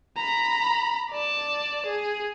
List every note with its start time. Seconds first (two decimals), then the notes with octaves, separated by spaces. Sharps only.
0.17 A#5 B5
1.11 D5 A5
1.86 G#4